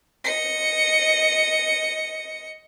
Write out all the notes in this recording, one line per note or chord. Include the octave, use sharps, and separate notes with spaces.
D#5 C#7